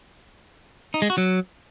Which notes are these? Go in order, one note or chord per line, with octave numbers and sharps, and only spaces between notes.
D#4
G#3
F#4
F#3